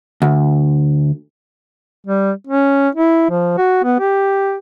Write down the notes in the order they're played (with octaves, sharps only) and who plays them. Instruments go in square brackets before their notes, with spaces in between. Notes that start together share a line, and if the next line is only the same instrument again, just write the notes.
[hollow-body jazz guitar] D2
[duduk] G3
C#4
E4
F3
F#4
B3
G4